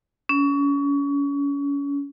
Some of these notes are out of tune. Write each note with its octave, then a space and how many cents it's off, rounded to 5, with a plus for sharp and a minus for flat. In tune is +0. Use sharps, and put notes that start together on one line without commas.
C#4 +30